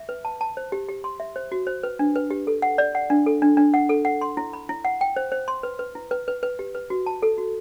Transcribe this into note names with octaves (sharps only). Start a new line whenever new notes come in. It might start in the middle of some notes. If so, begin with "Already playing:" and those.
Already playing: E5
B4
A5
A5
C5
G4
G4
C6
E5
C5
F#4
C5
B4
D4
B4
G4
A4
F#5
D5
F#5
D4
A4
D4
D4
F#5
A4
F#5
C6
E4
B5
E4
F#5
G5
C5
C5
C6
B4
B4
E4
B4
B4
B4
G4
B4
F#4
A5
A4
F#4